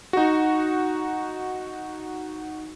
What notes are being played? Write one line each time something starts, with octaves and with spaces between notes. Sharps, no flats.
D#4 F#4